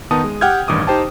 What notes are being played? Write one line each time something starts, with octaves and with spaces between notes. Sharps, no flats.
D#3 B3 D#4 A5 D#6
G#3
G4 F#5 G5 F6 G6 G#6
A1 G2 D#3 D6 D#6
D#4 G4 C5 G5 A5